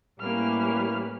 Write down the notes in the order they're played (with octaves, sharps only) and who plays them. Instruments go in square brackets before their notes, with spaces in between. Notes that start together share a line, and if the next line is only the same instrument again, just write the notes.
[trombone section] A2 [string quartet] G3 C#4 B4 [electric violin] A#3 F6